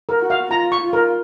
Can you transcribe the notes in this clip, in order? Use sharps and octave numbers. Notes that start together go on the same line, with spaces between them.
A#4
F#4
F5
F4 A#5
C#6
F4
A#4